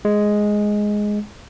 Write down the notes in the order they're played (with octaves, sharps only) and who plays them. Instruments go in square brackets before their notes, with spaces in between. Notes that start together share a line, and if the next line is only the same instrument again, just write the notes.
[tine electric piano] G#3